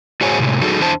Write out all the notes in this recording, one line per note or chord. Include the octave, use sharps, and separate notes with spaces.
A2 F#4 G#4 C5 C#5 G#5
A2 C3 D#3 G#3
F#3 D#4 F#4 G#4 A4
E2 D4 E4 C5 A5